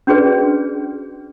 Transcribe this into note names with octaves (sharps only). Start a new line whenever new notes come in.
C#4 D4 F#4 G#4 B4 D5